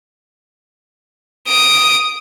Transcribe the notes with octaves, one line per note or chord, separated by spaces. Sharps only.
D#6 D7